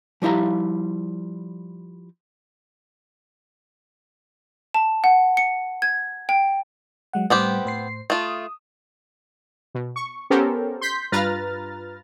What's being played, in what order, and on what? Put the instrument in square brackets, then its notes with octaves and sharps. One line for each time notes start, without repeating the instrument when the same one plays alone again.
[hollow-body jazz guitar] F3 G3 E4 F5 A#5
[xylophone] A5
F#5
C#7
G#6
G5
[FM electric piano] F#3 G#3 F#5
[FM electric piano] A2 G3 [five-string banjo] B3 C4 G4
[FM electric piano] A2 C5 C7
[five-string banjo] A3 F4 [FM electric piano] D#6
[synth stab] B2
C#6
B3 C#4 G4 A4 A#4 C5
C6 G6 B6
G2 F4 B4 A#5 F6 A6